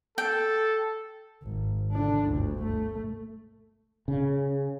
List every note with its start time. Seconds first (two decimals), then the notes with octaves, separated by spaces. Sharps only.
0.18 A4 G5
1.43 G#1
1.92 D3 D4
2.28 G1 D2
2.62 A3
4.08 C#3